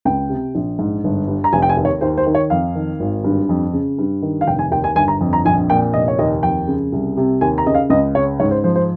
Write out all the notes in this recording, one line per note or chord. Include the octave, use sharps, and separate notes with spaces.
C#2 G5
C3
A#1
G#2
G1
G2
A#5
F1 G#5
G5
G#5
D#2
C#5
D#2 C5
C5
D#3
C#5
F2 F5
D#3
G#1
G2
F2
C#3
G2
D#3
F5
F1 G5
G#5
D#2 G5
G#5
G1 G#5
A#5
F2
A#5
A#1 G#5
A#2 G5
F1 D#5
C#5
D#2 D#5
F2 G5
C#3
C2
C3
D#2 G#5
A#5
C#3 D#5
F5
C#2 D#5
C#3 C#5
G#2 C#5
C5
F3 C5
C5